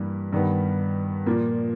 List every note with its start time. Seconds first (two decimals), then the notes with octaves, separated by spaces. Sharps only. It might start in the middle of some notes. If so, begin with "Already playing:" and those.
Already playing: G2 E3 G3 A#3
0.33 G2 D#3 G3 B3
1.26 A#2 F3 A#3